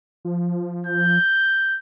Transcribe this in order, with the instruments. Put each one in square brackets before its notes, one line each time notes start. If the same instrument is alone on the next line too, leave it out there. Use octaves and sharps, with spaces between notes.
[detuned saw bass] F3
[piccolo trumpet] G6